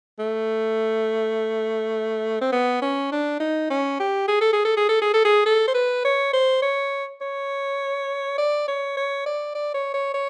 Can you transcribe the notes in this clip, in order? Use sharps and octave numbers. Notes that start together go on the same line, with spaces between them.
A3
C4
B3
C#4
D4
D#4
C#4
G4
G#4
A4
G#4
A4
G#4
A4
G#4
A4
G#4
A4
C5
B4
C#5
C5
C#5
C#5
D5
C#5
C#5
D5
D5
C#5
C#5
C#5